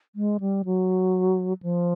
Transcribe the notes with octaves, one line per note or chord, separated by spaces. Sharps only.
G#3
G3
F#3
F3